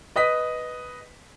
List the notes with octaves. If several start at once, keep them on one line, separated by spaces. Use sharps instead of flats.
B4 D#5 D#6 B6